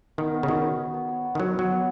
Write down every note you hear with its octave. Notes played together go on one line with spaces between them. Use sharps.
D#3 B3
B3
C#3
D#3 F#4
F#4
C#5
B3
C#5
B3
D#3
F#3 F#4
F#3 B3
B3